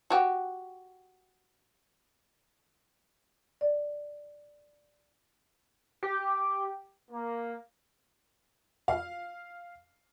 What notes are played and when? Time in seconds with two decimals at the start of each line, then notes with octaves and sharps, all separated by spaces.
0.10 F#4 G4
3.61 D5
6.03 G4
7.11 A#3
8.88 F5